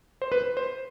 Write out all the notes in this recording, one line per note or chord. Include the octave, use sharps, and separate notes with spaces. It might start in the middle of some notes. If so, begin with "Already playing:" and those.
C5
B4
C5